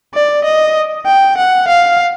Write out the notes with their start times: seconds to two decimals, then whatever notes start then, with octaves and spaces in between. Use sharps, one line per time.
0.14 D5
0.44 D#5
1.06 G5
1.37 F#5
1.68 F5